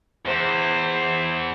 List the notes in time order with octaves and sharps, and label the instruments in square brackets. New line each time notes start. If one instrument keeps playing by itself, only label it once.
[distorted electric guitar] E2 [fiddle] C5